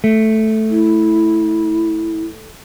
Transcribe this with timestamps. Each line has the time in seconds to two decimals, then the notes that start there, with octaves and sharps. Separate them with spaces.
0.04 A3
0.70 E4